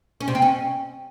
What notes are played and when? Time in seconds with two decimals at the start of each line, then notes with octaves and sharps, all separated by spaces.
0.21 C#4
0.28 C3
0.35 C4
0.42 C#4